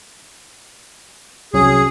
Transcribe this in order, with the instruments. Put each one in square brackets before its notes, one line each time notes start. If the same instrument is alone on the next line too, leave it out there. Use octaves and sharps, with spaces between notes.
[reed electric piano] C2 F#3 C#4 [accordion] G#4